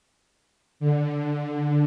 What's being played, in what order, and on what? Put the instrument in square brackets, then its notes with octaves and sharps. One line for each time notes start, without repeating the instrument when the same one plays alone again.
[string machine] D3